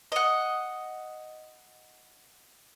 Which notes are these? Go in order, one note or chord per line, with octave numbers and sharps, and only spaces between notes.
D#5 F#5